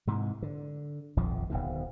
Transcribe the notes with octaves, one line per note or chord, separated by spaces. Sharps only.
G#2 C3 E3
D3
D#1 A#1 F2 F3
D1 B1 B2 D#3